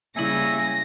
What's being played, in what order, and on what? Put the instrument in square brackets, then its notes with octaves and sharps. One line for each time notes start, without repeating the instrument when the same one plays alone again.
[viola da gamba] C#3 G3 [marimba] A#3 E4 [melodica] E5 G#5 [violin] A#6